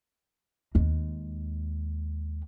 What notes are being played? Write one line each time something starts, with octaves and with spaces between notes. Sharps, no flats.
D#2 G#3